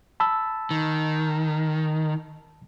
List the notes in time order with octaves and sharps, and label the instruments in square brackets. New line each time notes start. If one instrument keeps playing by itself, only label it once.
[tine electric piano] A5 B5 E6
[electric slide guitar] D#3